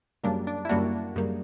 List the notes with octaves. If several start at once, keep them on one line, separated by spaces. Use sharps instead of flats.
F#2 C#3 G3 A#3 D4
D4
E4
F#2 C#3 G3 A#3 D4 F#4
F#2 C#3 G3 A#3